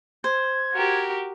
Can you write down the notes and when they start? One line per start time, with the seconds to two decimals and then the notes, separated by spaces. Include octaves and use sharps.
0.24 C5 G#6
0.74 F#4 G4 A#4